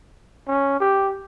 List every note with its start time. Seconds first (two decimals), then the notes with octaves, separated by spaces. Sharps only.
0.48 C#4
0.80 G4